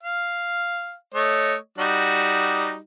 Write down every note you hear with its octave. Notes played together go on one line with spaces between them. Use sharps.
F5
A3 C#5 D#5
G3 D#4 F#4